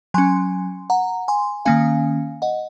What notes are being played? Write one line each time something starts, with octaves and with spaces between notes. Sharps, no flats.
F#3 C#4 G#5 C6
F#5 A#5
G#5 C6
D#3 A#3 C#4 F5 G#5
D#5 F#5